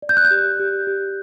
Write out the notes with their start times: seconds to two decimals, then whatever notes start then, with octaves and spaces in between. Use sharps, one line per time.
0.02 D5
0.09 G6
0.17 F#6
0.25 G6
0.31 G4
0.60 G4
0.87 G4